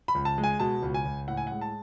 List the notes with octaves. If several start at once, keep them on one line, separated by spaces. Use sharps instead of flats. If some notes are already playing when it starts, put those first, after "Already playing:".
B5
C#2
A5
G#3
G#5
B2 A5
C#2
G#5
C#2
A2 F#5
G#5
G#3 F#5
A5